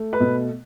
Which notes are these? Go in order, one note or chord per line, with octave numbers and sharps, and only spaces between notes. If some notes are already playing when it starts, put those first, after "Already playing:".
Already playing: A3
B4
B2